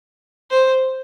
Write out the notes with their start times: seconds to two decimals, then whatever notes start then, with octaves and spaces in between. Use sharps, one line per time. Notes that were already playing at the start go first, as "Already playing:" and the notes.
0.51 C5